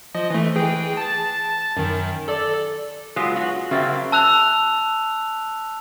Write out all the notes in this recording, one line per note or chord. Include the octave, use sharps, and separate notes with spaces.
F3 D#5
E3 A3
E3 G#4 G5
A5 A6
F#2 D#3
A4 D5
F#3 G#3 B3 F4
F#4
C#3 F#3 A#3 C4 E5 A6
A5 E6 F#6 F7